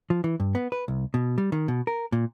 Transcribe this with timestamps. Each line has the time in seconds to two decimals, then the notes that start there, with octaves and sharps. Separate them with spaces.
0.10 F3
0.24 E3
0.40 G2
0.55 B3
0.72 B4
0.88 C2
1.14 B2
1.38 G3
1.52 D#3
1.68 B2
1.87 A#4
2.12 A#2